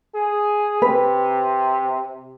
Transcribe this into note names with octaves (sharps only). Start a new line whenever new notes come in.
G#4
C3 B4